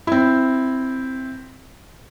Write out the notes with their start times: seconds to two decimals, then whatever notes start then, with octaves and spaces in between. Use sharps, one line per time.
0.07 C4 E4